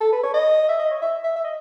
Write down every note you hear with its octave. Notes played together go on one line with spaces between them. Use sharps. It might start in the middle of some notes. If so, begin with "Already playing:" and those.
A4
B4
C#5
D#5
E5
D#5
C#5
E5
E5
E5
D#5